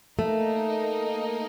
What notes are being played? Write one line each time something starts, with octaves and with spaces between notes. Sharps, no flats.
A3 A#3 D#4 A#4 D#5